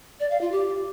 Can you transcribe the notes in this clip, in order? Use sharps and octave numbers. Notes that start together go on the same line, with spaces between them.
D5
F5
F4
G4